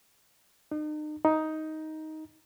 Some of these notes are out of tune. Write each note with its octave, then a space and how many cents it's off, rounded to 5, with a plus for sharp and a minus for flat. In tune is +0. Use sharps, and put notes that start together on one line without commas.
D#4 -40
D#4 +10